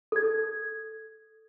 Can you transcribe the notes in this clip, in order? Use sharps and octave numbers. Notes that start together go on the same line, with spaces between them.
A4 G#6